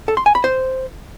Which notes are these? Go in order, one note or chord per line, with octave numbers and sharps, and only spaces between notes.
A4
C6
G#5
B5
C5